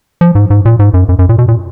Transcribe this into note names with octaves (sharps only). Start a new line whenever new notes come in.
F3
G#2
G#2
A#2
G#2
F#2
F#2
F#2
A#2
B2
A#2